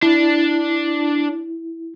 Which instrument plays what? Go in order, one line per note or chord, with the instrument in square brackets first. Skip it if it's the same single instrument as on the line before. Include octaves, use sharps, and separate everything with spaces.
[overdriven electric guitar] D4 [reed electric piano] E4